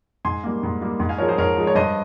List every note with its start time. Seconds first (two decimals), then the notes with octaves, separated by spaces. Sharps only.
0.25 G#2 G#5 C6
0.44 G3 A#3
0.63 G#2
0.82 G3 A#3
1.00 G#2
1.09 F5 G#5
1.18 F3 A#4 C#5
1.22 G#3
1.29 G#4 C5
1.38 G#2 A#4 C#5
1.56 F3 G#3
1.67 C#5
1.75 G2 C5 D#5